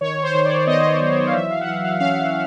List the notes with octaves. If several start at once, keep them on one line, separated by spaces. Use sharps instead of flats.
D#3 C#5
C5
D#3
D5
B3 D#5
F#3 D#5
F5
E3 E5
F5
F#5
E3 F5
F5
C#4 F5